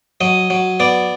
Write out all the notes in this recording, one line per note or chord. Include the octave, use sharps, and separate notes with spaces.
F#3 D#5
F#3
B3 D5